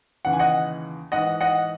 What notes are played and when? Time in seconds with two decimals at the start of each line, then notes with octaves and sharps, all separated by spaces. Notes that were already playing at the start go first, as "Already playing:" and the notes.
0.25 D#2 C#3 E3 F#5
0.33 G#5
0.39 D#5 F#5
1.12 G#2 E3 D#5 F#5
1.41 D#5 F#5